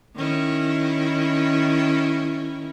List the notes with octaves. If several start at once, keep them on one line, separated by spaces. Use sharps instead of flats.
D#3 C#4 E4